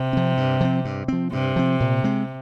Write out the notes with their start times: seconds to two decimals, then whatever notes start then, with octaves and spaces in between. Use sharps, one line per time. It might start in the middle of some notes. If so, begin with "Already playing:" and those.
Already playing: C3
0.13 F3 C4
0.37 G2
0.61 F3 C4
0.85 G2
1.08 F3 C4
1.32 G2 C3
1.56 F3 C4
1.80 A#2
2.04 G#3 C4